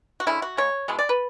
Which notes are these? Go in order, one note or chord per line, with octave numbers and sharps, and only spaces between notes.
F#4
D3 G#3 C#4 E4
F#4
C#3 G#3 C#5
B2 G#3 B3 E4
D5
B4